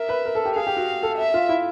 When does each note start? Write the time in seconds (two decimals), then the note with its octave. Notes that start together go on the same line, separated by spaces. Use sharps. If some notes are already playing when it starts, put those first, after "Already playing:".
Already playing: A#4 E5
0.09 B4
0.25 A#4
0.35 A4
0.45 G4
0.56 G#4 F5
0.67 G4
0.77 F#4
1.03 A4
1.18 E5
1.34 F4
1.49 E4